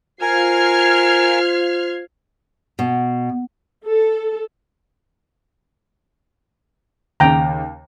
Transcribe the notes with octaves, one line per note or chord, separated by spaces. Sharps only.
F4 A#4 C5 G#5 F6 G#6 C7
B2
A4
D#2 C#3 G5 A#5